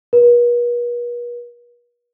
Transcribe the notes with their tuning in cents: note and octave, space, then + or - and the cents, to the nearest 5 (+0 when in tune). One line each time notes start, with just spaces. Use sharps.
B4 -45